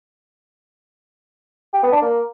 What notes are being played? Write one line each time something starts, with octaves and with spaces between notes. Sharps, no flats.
G4
B3
D4
A#3